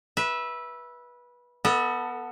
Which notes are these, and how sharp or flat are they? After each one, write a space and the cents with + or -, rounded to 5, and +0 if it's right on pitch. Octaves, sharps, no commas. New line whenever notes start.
B4 -20 E5 -5
B3 -10 A4 +20 E5 -45